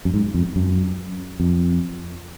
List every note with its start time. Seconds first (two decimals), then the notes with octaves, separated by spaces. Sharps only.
0.05 F#2
0.14 G#2
0.34 F2
0.56 F#2
1.40 F2